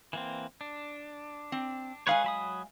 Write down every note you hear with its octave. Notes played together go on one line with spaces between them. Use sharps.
E3 A#3 C4
D4
C4
G#3 G#4 B4 C#5 F5 G#5
F#3 B5 D#6